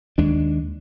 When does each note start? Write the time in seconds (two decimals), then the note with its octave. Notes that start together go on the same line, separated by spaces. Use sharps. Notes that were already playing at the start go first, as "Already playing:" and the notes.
0.18 D#2 G#3 D4